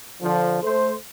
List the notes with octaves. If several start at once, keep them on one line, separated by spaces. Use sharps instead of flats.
D3 F3
A3 C5